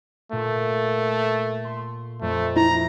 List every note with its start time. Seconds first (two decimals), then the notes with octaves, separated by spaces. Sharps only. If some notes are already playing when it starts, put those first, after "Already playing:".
0.32 A#2 A3
1.64 C6
2.22 F2 A3
2.56 E4 A#5